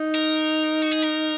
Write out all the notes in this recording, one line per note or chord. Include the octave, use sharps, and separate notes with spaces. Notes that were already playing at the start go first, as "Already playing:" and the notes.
Already playing: D#4
A#4
F#4
G#4
A#4